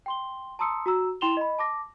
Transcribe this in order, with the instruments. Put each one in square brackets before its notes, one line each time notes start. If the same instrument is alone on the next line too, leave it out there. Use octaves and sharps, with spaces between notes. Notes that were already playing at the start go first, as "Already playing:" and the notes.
[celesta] G5 C6 G7
A5 A#5 C6 D#6 E6 C#7
F#4 A#5 E6
E4 G5 C6 E7 F7 G7
D#5 B5
A5 D6 A#6